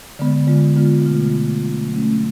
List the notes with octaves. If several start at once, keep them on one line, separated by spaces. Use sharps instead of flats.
D3 G#3 B3
D3 G#3 B3 F4
D3 G#3 B3 F4
B2 A3 F4
B2 A3 F4
F#3 A3 C#4
F#3 A3 C#4